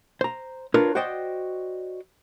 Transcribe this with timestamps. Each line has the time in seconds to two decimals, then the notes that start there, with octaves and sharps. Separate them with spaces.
0.21 C5 A#5
0.74 D4 F4 A#4 B4 C#5
0.95 F#4 C5 D5 D#5 G5